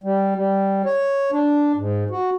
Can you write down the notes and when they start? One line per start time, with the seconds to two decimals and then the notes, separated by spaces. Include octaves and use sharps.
0.04 G3
0.36 G3
0.85 C#5
1.32 D4
1.76 G#2
2.11 F#4